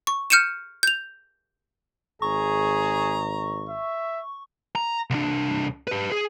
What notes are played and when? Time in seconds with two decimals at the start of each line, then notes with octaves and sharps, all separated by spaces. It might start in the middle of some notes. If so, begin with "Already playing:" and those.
0.07 C#6
0.30 F6 G6 C#7 D#7 E7
0.83 G6 F7
2.22 G#1 G#4 A#5 C#6
3.69 E5
4.75 A#5
5.10 C2 D4
5.87 G4 B4
6.12 G#4